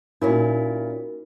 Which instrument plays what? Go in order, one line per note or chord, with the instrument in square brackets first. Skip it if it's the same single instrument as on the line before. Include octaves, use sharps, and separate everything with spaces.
[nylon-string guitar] A#2 C#4 E4 [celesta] D#4 F#4 A#4